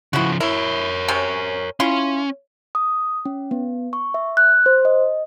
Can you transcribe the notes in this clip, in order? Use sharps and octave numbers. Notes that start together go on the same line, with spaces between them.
C#3 F3 E4 F#4
E4 A#4 C#5
C3 C4 C#4
C#4 E4 F4 C6
D#6
C#4
B3
C#6
E5
F#6
C5
D#5